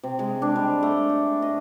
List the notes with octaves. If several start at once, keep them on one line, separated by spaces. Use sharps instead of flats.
C3
G#3
D4
G3
A3
A3
D#5